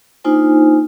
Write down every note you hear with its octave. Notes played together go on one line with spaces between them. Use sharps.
A#3 D4 D#4 F4 C5 G#5